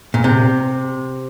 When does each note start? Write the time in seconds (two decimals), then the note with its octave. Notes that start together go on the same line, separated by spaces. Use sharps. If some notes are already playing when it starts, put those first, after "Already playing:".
0.14 A#2
0.24 C3